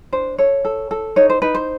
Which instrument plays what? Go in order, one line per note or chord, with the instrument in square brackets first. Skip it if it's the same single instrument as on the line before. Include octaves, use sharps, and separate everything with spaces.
[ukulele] D4 C5
A4 C#5
A4
A4
D#4 C#5
C5
D#4 B4
C5